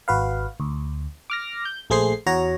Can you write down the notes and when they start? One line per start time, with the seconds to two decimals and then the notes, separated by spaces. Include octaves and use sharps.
0.08 G#1 F#4 B4 F5
0.60 D2
1.30 D6 F6 A#6
1.65 G6
1.90 A#1 A3 G#4 C5 C6 C7
2.26 E2 F#4 C#5 A#5